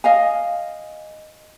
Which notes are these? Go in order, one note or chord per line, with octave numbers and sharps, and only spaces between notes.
D#5 F5 G#5